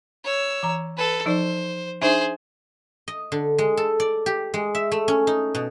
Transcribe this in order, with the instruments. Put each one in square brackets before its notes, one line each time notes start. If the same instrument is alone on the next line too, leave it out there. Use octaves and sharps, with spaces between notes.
[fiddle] C#5 E6
[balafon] E3 A#5
[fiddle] A4 B4
[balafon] F3 D#4 D5 [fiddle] C5
[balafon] D4 D#4 E5 [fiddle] G#4 C5
[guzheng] D#5
D3
G#3
A4
D5
G4
G#3
E5
A3
C#4
D#4
B2